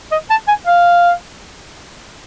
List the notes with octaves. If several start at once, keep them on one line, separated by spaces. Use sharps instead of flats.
D#5
A5
G#5
F5